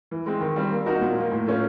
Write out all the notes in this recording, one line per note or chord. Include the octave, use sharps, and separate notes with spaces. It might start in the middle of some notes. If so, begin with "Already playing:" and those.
E3
G#3 C4
D#3
G3 C4
A#3
D#4 F#4 A#4
A#2
F3 A#3
A2
F3 A3 C#4